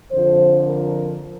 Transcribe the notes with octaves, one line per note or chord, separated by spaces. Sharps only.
F2 D3 F3 C5
A#4